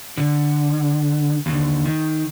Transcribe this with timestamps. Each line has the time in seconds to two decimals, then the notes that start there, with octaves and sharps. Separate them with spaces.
0.17 D3
1.46 D#2 D3
1.85 D#3